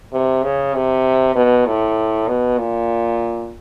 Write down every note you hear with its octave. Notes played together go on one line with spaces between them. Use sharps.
C3
C#3
C3
B2
A2
B2
A#2